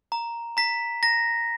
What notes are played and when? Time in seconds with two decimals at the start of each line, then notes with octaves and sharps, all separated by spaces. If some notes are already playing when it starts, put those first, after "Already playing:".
0.12 A#5
0.57 A#5 B6
1.03 A#5 A#6